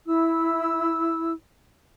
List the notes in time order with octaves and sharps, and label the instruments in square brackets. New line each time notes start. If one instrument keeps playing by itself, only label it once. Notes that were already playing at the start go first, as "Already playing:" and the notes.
[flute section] E4 E6